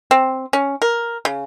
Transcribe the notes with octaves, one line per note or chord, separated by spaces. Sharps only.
C4
C#4
A#4
C#3